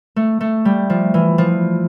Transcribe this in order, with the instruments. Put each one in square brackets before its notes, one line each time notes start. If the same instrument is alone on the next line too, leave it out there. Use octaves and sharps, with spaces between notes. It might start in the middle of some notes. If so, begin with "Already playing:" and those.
[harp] A3
A3
G3
F3
E3
F3